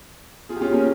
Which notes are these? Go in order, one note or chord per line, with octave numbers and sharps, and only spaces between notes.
F4 G#4
G4
C#4 F4
A#3 C#4